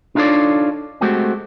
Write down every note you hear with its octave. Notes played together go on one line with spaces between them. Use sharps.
D4 D#4 F4 A4 C#5 D5
G#3 A3 C4 F#4 G4